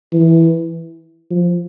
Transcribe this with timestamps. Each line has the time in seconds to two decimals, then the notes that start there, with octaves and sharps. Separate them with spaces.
0.13 E3
1.30 F3